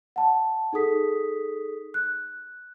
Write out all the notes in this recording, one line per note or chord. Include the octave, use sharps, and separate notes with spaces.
F#5 A5
D#4 G#4 A4 D#6 B6
F#6